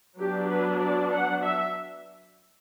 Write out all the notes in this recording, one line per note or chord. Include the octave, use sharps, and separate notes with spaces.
F#3 B3 D4 G4
B4
D5
F#5
E5